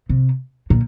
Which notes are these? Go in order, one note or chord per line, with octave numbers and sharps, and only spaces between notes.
C3
A#2